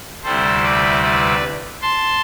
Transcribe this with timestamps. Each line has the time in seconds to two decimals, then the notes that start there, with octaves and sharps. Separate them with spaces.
0.23 D2 C3 G3 C4 E4 A4 C5
0.63 B4 D5
1.02 B4 D5
1.81 A5 C6